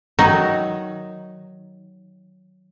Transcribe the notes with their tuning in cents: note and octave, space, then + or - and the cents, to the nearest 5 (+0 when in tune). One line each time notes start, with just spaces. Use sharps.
D#3 +0 F#3 +5 D#4 +0